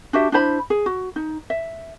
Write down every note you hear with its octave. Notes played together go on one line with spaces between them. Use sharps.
D4 F#4 G4 E5
D4 E4 C5 B5
G#4
F#4
D#4
E5